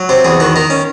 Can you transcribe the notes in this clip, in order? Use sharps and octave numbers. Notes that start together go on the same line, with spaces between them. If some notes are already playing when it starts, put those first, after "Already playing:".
Already playing: F#3
C3 C5
E2 G#4
D#3 F#4
D#3 D#4
C#4